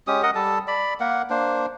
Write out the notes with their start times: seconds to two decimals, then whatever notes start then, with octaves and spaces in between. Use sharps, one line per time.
0.07 G#3 C#4 G4 D#6
0.23 A#4 D#5 F#5 D#6
0.35 G3 A4 A5
0.67 D5 B5
1.00 A#3 A#4 F#5
1.30 A#3 D4 C5